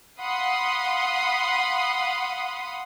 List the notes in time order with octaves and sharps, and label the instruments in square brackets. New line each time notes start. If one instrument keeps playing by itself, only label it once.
[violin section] F5 F#5 B5 C6 D#6